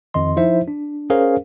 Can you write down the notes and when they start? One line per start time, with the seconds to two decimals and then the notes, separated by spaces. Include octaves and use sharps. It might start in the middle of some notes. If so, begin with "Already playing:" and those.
0.14 F2 D#3 D#5 C6
0.36 F3 D#4 E4 C5 E5
0.68 D4
1.10 C#4 G#4 A#4 C5 F5